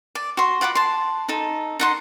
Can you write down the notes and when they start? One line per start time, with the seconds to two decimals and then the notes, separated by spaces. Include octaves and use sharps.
0.15 D5
0.37 F#4 C6
0.61 F4 F#5 B5 D6
0.75 A5 C6
1.28 D#4 A4
1.80 D#4 F#5 C6